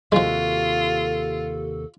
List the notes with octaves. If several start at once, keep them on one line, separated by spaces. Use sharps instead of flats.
D#2 C3 F3 G#3 F4 F#4 A4